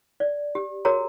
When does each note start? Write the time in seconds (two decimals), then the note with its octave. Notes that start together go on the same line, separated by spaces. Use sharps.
0.20 D5
0.55 G4
0.85 F#4 G#4 A#4 C#5 A#5